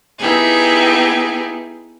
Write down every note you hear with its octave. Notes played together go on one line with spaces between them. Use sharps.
B3 D#4 E4 G4 G#4